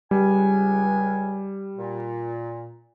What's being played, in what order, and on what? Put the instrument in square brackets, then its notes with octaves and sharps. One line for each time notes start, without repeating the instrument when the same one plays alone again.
[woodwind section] C#2 G#5 [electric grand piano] G3
[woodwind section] A#2